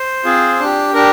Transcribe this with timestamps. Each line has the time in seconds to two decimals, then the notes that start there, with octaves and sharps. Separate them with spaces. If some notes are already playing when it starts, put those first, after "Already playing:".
Already playing: C5
0.25 C4 F4 G#4
0.60 D4 G4
0.94 D4 G4 A#4